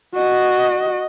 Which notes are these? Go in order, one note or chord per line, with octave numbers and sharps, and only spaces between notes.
F#4 D#5